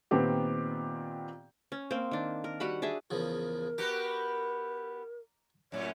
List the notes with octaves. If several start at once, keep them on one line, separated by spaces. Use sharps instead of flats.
A#2 D#3 B3 C4 G4
C#4
A#3 C4
D#3 D4
A#4
G3 F#4 F#5 B5
D4 G#4 E5
E2 C#3 F3 A#4
B3 F#4 G4 A#5 D6
F#2 A2 C#4 C#5